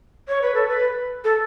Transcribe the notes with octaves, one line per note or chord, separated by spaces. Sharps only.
C#5
B4
A4
B4
A4